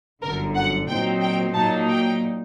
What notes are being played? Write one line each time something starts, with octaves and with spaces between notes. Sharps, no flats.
G1 F#2 D3 A#4
F#5
A#2 F#3 C4 D#4 G5
G5
A#2 F#3 A#3 D#4 A5
G5